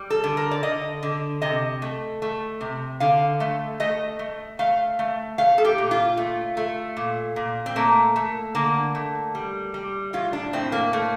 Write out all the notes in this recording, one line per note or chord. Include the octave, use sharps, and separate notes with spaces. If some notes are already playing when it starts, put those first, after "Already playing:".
Already playing: G3
A4
D3
A#4
D5
D3 D#5
D3
C3 D#5
A3
A3
C3
D3 F5
A3
A3 D#5
A3
A3 F5
A3
A3 F5
A4
G4
A#2
F4
A3
A3
A#2
A#2
C4
A3 A#3
A3
D3 A#3
A3
G3
G3
A2 F4
D4
A2 C4
A#3
A3